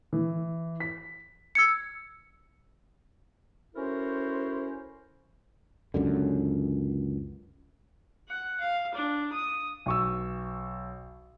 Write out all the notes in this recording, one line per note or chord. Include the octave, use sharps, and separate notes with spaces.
E3
B6
E6 G#6 C#7
C#4 E4 F#4 A4 A#4 C5
C#2 F#2 D3
F#5
F5
D4
D#6
B1 C#6 E6